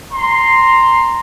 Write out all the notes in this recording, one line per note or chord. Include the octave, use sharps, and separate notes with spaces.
A#5 C6